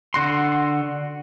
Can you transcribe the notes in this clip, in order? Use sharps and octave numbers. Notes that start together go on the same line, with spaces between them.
D3 F#4 C6